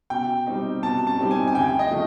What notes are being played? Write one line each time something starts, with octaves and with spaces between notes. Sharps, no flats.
B2 G5
G3 C4 D#4
B2 A5
A5
G3 C4 D#4
G#5
G#5
D2 G5
D#5
C#3 F3 A3